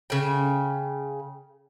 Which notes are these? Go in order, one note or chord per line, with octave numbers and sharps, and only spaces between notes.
C#3 G5